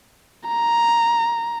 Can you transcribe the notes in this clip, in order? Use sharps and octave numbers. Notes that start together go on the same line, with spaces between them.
A#5